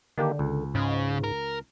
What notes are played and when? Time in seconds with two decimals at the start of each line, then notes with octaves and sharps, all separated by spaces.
0.18 D3 D#3 A#3 G4
0.39 C#2
0.75 G#2 C#3
1.24 A#4